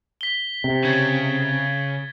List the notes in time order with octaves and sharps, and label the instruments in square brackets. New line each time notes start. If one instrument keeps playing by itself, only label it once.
[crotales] B6 G7
[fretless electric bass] C3
[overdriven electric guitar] C#3 [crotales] G#6 A6